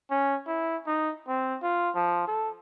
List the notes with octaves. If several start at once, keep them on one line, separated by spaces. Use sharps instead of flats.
C#4
E4
D#4
C4
F4
F3
A4